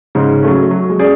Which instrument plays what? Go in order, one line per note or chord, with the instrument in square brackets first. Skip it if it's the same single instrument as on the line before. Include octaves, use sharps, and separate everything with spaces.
[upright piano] G#2 [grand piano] C#3
[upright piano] F#3 A3 C#4
F#3
[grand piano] G#3
[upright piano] C#4 G#4 D5